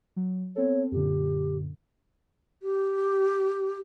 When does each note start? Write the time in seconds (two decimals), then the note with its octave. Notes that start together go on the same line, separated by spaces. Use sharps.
0.16 F#3
0.56 B3 C4 A4 C#5
0.92 F#2 A#2 D3 G4
2.63 G4